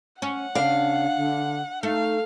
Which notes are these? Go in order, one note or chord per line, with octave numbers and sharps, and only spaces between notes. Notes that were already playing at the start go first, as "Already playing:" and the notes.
C#4 F#5
C#3 D4 F5
D3
A3 D#4 F5